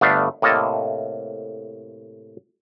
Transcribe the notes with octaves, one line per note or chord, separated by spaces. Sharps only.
G1 A3 B3 D4 F5
A2 C3 A#3 A4 D#5 A5